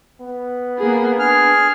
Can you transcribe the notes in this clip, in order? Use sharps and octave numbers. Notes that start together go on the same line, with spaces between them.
B3
A#3 G#4
D4 G#4 F6